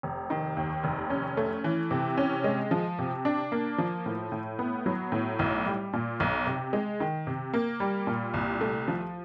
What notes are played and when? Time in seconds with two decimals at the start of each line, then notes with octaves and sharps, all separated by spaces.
0.03 F1
0.30 D#3
0.57 D#2
0.84 F1
1.10 C#4
1.37 A3
1.64 E3
1.91 C3
2.17 C#4
2.44 G#3
2.71 F3
2.99 C3
3.25 D4
3.52 A#3
3.78 F3
4.06 A2
4.32 A2
4.59 B3
4.86 F#3
5.12 A2
5.39 B1
5.66 G3
5.93 A#2
6.20 B1
6.47 C3
6.73 G#3
7.00 D#3
7.27 C3
7.54 A#3
7.80 G3
8.07 A#2
8.34 C2
8.61 A3
8.88 F3